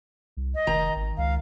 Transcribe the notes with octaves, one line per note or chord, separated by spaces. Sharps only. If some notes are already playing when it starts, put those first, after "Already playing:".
C2
D#5
F1 D#3 A#5
G#1
C#2 F5